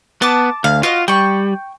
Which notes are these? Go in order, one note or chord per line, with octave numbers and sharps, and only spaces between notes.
B3 A5 D6
D2 F5
F4 F#4 D#5 F5
G3 G5 C#6